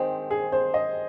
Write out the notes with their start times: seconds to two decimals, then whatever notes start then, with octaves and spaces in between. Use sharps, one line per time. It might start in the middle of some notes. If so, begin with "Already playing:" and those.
Already playing: D#3 G#3 C4 C5
0.31 G#4
0.52 C5
0.74 D#5